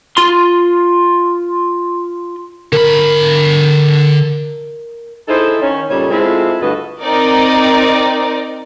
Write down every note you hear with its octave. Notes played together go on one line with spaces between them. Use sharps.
F4 C6
D3 A#4 B5
D#4 E4 G#4 A4 C5 D#5
D#3 C#4
A#2 C#3 G3 D#4 A4 C#5
G#3 A3 C4 E4 F4 A4
D2 G2 F#4 A4 B4 D#5
C4 D#4 A#4 D5